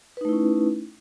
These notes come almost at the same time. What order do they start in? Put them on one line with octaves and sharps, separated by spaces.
B4 D#4 A3 E4 C#4